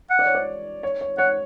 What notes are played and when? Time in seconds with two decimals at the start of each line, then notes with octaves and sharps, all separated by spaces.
0.11 F#5
0.19 D5
0.26 C#5
0.35 D5
0.83 C#5
1.01 C#5
1.18 C#5 F#5